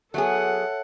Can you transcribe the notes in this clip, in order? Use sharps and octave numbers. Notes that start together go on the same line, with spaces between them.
F#3 B3 G#4 A4 C#5 E5 F#5 A5